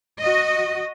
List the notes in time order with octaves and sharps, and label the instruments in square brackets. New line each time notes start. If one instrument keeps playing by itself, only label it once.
[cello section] F#4 D#5